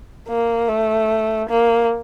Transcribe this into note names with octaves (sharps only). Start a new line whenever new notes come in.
A#3
A3
A#3